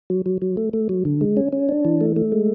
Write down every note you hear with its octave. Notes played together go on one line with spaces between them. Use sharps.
F#3
F#3
F#3
A3
A3
F#3
D3
G#3
C#4
C#4
D4
E3
A3
A3
G#3